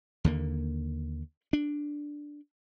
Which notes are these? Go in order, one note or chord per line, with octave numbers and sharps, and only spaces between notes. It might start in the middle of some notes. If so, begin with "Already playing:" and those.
D#2 D3 A#3
D4